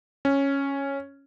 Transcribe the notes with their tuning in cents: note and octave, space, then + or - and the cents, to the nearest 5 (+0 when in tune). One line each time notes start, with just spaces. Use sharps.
C#4 -5